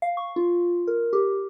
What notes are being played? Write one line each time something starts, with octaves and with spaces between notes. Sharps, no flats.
F5
C#6
F4
A#4
G4